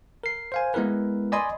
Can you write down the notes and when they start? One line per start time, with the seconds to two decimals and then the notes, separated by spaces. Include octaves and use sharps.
0.24 A#4 C7
0.52 C5 F5 G#5
0.74 G#3 B3 E4 A#4 B4
1.32 D5 D#5 G#5 B5 C6 D#6